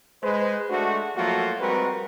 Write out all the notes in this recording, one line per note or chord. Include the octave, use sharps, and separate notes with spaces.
G#3 B4 C5
G#3 A3 D4 F#4
F3 F#3 A3 A#3 F4 F#4
G3 G#3 C4 F#4 A#4 B4